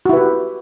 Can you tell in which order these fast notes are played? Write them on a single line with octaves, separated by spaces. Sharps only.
F#4 E4 B4 G4